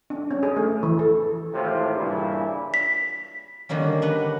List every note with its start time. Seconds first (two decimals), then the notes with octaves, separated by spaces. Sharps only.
0.10 D4
0.31 C#4
0.43 G#4
0.56 A3
0.83 E3
0.99 A4
1.54 G#1 A2 C3 F4
1.94 G2 A#2 C#3 E3 E4
2.74 B6
3.69 D3 D#3 G3 A#3 C#4
4.02 D4 B4 F#5 A#5